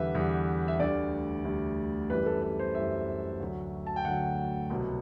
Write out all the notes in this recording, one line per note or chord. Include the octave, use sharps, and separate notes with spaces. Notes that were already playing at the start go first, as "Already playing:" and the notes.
Already playing: E2 D3 G3 B4 E5
E2 D3 G3
E5
D2 D3 G3 D5
D2 D3 G3
F#2 E3 G3 B4
A4
B4
C5
F#2 E3 G3 E5
D2 D3 F#3
A5
G5
D2 D3 F#3 F#5
C2 B2 F#3